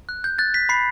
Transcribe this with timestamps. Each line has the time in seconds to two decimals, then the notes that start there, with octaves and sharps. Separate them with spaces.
0.09 F#6
0.24 G6
0.38 F#6 A6
0.54 B6
0.69 B5 C7